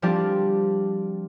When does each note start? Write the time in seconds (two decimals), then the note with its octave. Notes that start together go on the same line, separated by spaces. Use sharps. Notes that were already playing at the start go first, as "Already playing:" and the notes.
0.02 F3 G3 C4 D4 G4 D5